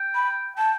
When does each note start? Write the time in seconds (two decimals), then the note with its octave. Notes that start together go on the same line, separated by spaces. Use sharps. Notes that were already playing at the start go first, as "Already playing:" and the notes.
Already playing: G5
0.15 B5
0.57 G5 A5